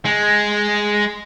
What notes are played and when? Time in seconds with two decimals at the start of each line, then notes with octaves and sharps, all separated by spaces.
0.05 G#3